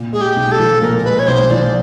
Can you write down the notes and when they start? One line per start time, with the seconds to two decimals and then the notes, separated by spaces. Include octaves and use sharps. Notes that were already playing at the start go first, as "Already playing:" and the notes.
Already playing: A#2
0.13 G#3 G#4
0.21 G4
0.36 B1
0.52 A4
0.59 F3
0.82 A#2 A#4
0.98 A#4
1.04 G#3 B4
1.19 C#5
1.27 B1 C5
1.50 F3 D5